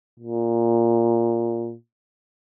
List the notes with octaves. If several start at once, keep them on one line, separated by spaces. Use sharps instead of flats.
A#2